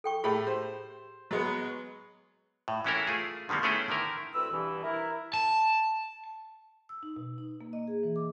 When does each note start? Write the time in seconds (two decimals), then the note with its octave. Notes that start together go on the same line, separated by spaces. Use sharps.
0.04 A4 G5 C#6
0.24 A2 G4 G#4 B5
0.47 G4 C5
1.31 F#3 G#3 B3
2.68 A2
2.85 E3 G#3 C#4 E4 A4 A#4
3.07 A3 F4 G#4
3.49 D3 D#3 G3 A#3 B3
3.63 A3 B3 C#4 E4 G#4 G5
3.88 D3 D#3 E4 A#4
4.34 D2 E3 C4 B4 E6
4.52 G2 B2 E3
4.84 E4 A#4
5.34 A5
6.89 E6
7.03 D#4
7.16 B2
7.38 D#4
7.61 A#3
7.73 D#5
7.88 G#4
8.03 E3
8.16 D6